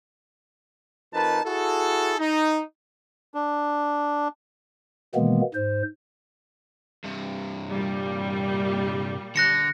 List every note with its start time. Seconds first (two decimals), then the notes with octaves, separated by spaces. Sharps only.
1.14 F2 D#4 A#4 B4 A5
1.45 E4 F#4 G#4 A4
2.19 D#4
3.35 D4
5.15 B2 D#3 E3 G#3 A#3 B3
5.54 G#2 C5
7.04 G2 C3
7.69 A#2 G3
9.36 D3 F#6 A#6 C#7